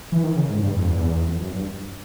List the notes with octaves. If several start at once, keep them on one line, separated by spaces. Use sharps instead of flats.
E3
D#3
C#3
G#2
G2
F2
E2
F2
F#2
G2